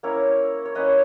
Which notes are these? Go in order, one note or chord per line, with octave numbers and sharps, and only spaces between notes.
A#3 C#4 E4 A#4 C#5
C#5
A#3 C#4 E4 B4 D#5